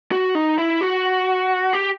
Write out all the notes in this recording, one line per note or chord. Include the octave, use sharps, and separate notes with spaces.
F#4
D#4
E4
F#4
G4